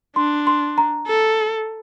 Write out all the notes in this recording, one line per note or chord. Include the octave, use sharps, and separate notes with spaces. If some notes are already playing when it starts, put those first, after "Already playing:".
D4 C6
C6
A#5
A4